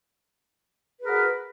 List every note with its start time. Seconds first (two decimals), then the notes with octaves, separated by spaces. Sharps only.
1.01 B4
1.03 G#4
1.06 A#4
1.09 F#4